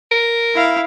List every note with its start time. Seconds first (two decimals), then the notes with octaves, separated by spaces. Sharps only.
0.11 A#4
0.55 E4 F5